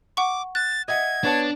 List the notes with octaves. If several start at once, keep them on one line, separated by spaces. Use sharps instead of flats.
F#5 C#6 D6
F#6 A6
D#5 E5 F#5 G#6
B3 D4 C#5 A5